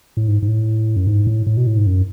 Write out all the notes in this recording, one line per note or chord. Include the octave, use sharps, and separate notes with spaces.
A2
G#2
G#2
A2
F#2
G#2
A2
A2
B2
A2
G#2
F#2